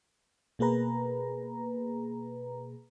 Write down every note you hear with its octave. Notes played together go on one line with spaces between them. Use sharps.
B2 A#3 G#4 B4 A#5